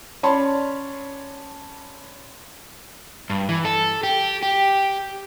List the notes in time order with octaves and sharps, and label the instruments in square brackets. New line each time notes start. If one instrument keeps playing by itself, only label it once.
[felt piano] C#4 C#5 D5 A5 B5 C6
[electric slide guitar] G2
E3
A4
G4
G4